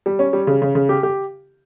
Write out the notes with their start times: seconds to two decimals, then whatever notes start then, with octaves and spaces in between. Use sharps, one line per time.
0.06 G3
0.19 C#4
0.33 G3
0.47 C#3
0.62 C#3
0.75 C#3
0.89 G4
1.03 G4